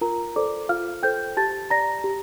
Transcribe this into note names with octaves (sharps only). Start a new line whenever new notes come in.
F4 A#4 A#5
A4 C5 D5 D6
F4 F5 F6
A4 C5 G5 G6
G4 A5 A6
D5 A#5 A#6
G4